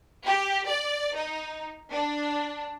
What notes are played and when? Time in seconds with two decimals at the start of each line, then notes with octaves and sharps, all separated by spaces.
0.26 G4
0.68 D5
1.16 D#4
1.92 D4